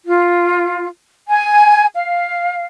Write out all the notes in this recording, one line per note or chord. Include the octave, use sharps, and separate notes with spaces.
F4
G#5
F5